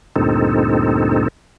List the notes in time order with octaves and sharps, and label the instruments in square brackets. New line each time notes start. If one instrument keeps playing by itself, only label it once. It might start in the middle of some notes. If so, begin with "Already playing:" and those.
[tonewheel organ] D2 G2 A#2 C4 D#4 A4